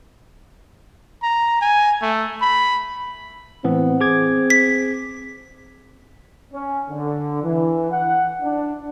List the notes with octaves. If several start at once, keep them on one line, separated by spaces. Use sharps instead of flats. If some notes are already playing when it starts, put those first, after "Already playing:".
A#5
G#5
A3
B5
A2 E3 B3 C4
G#4 D6 G#6
B6
C#4
D3
E3
F#5
D4